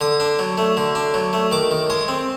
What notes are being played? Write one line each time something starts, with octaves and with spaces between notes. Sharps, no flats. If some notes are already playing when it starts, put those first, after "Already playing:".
D3 D#6
D4
F#3
A3
D3
D4
F#3
A3
D#3 D6
D#3
G#3 D#6
C4